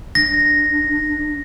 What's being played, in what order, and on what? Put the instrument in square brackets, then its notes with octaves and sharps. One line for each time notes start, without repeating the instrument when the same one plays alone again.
[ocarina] D4 [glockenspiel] A#6